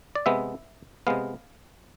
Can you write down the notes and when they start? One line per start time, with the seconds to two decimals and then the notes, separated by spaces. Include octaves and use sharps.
0.15 D5
0.26 C3 G#3 B3 E5
1.07 C3 G#3 B3 F5